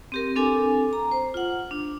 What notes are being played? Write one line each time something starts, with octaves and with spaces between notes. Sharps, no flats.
C4 G4 A#4
C4 D4 A4 G#5 D6
A#5
C5
F4 F#5
D4